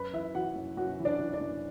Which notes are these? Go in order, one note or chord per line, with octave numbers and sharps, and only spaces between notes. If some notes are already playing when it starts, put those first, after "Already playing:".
Already playing: F#2 B4 B5
E3 E4 E5
E3 F#4 F#5
F#2
F#2 F#4 F#5
E3
D4 D5
E3
D4 D5
F#2